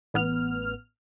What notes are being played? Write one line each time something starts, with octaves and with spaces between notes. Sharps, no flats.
A1 B3 F6